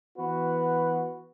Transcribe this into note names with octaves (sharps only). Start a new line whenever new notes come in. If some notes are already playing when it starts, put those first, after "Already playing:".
E3 B3 F#4 B4